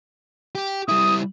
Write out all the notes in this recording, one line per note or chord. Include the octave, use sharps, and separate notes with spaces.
G4
G3 E4 D#6